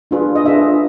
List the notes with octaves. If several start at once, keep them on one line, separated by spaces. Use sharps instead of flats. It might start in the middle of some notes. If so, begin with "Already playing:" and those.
D4 F4 G#4 B4
D#5
D4 F4 G#4 B4 E5